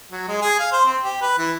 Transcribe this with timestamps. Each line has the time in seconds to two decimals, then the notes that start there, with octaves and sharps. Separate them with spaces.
0.12 F#3
0.28 G#3
0.42 G#4
0.60 F5
0.72 C5
0.85 C4
1.03 G4
1.22 B4
1.38 E3